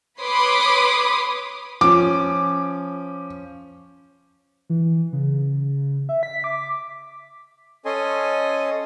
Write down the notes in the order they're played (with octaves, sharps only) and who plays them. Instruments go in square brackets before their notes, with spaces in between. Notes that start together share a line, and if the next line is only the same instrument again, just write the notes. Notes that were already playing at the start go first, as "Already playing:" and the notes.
[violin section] B4 C#5 B5 C6 D6 D#6
[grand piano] F3 C#4 [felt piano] D6
[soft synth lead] E3
C#3
E5
B6
D6
[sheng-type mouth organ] C#4 A4 D#5 G#5 C6